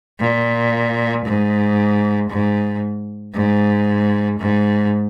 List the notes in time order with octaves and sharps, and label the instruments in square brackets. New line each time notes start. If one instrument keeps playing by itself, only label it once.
[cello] A#2
G#2
G#2
G#2
G#2